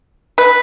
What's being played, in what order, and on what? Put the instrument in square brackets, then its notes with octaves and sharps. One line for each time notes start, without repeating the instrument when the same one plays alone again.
[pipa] B4